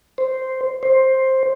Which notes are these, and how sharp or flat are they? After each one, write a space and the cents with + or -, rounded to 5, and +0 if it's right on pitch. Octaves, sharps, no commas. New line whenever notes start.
C5 -5
C5 +10